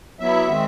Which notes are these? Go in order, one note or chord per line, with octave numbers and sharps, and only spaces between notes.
F#3 B3 E4 E5
D#3 G#3 C4